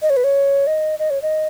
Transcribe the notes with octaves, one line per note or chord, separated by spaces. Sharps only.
D#5
C#5
B4
C#5
D#5
D#5
C#5
D#5